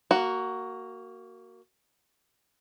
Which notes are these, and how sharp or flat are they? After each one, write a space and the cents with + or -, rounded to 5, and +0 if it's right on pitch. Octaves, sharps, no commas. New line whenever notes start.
A#3 -10 F#4 +10